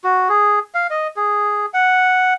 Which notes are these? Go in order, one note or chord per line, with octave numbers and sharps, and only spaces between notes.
F#4
G#4
F5
D#5
G#4
F#5